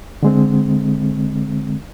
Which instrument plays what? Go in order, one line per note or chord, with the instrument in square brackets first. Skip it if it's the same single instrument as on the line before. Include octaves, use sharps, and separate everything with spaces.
[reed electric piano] D3 G#3 C4